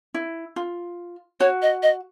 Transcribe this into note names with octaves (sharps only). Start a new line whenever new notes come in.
E4
F4
F#4 C#5
D#5
D#5